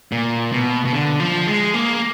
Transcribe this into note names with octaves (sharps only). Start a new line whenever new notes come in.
A#2
B2
B2
D3
F3
G#3
A#3